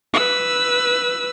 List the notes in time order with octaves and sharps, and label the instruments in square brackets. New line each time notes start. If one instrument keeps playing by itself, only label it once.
[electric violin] B4 E6